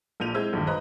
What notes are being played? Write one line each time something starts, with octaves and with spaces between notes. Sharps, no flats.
A#1 A#2 G6 D#7 F7
G#3 C4 E4 E6 G6 G#6
A#1 G2 D#3
B4 C5 D#5 A#5 F#6